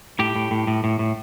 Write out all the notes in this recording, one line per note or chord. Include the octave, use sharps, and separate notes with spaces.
A2 G4
A2
A2
A2
A2
A2